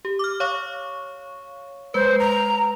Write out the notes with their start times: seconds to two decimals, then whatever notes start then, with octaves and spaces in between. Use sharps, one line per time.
0.05 G4
0.19 D6 F6
0.40 C#5 F5 C#6
1.94 G#3 B4 C5
2.20 A#5